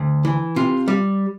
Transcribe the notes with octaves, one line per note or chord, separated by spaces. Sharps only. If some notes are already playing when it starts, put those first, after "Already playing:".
Already playing: D2
E3
C3 F4
G3